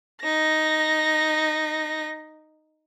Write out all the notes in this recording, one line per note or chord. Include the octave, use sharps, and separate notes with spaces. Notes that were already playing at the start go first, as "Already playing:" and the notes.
D#4 A#6